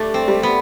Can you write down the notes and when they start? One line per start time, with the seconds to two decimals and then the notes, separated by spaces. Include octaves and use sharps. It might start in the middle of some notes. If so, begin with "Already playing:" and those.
Already playing: G3 A3 D4
0.14 C4
0.28 G3
0.43 B3